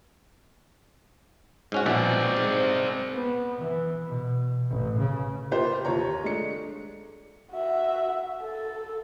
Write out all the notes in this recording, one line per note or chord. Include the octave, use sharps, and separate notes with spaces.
G#2 C#4 F#4
A#1 B2 C4 D5 E5
G#2
B3
E3
B2
A1
C#3
A#3 F4 G4 B4 C5
D#2 F4 C#5 A#5
G#3 A3 D4 C#7
F#4 E5
A4